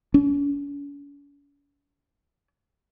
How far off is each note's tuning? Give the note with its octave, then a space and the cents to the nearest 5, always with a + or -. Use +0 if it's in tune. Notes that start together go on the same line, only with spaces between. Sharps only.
C#4 +45